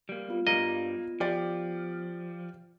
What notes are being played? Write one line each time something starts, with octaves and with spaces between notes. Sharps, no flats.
G3 A#3
B3 F4
G2 G3 A#3 D#5
F3 G4 D5